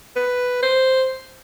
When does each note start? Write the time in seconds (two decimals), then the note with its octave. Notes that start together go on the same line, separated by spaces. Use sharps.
0.16 B4
0.63 C5